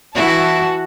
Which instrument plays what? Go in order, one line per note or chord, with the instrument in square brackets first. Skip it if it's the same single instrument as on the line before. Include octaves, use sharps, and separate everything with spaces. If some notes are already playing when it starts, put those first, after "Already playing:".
[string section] E3 A5 [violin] E4 [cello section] F#4